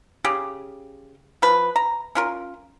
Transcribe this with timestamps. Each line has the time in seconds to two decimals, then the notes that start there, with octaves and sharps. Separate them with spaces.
0.24 C#3 G4 G#4
1.42 F3 B4
1.76 A#5
2.15 C#4 F4 A#4